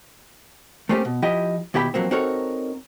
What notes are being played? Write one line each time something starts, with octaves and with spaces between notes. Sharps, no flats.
A3 A#3 C4 C#4 G4
B2
F3 E4 G4 D#5 G5
D#2 B2 E4 G4 G5 B5
F2 F#3 A#3 C4
C4 D#4 F#4 A4 A#4 C#5